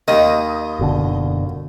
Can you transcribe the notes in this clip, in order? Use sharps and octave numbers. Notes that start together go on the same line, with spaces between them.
D#2 D#3 D#5
F#1 B2 D3